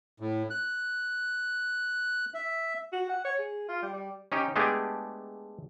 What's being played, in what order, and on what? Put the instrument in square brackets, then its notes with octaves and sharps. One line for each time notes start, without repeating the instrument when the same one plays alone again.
[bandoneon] A2
F#6
E5
[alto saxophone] F#4
F#5
C#5
G#4
F4
G3
G3
[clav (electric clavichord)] C#4 D#4 G4
G#3 A3 B3 D4 G4 G#4